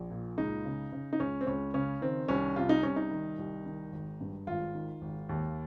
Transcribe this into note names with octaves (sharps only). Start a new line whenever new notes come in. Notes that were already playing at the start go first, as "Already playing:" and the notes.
Already playing: A#1
A#2
C#2 D#4
C#3
C#3
D#4
C#2 C#4
C4
C#2 C#4
C#3 C#4
D#3 C4
C2 C#4
C3 F4
D#4
C2 C#4
D#4
D#3
C2
D#3
G#1
G2
G#1 F4
D#3
G#1
D#2